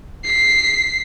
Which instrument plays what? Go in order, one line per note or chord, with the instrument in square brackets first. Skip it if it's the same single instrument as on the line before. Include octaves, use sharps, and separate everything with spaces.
[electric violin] B6 C7